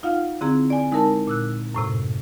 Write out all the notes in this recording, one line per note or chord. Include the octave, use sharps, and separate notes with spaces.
D#4 F4 F5 F#5 F6
D3 C4 E4 G#4 A#5
D5 G#5
G#3 D#4 E4 A#4 A5
A#2 E6 F#6
F#2 A2 C3